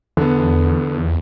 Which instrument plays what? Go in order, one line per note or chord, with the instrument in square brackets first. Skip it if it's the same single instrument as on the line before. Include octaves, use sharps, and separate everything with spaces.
[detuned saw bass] E2 [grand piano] D3 B3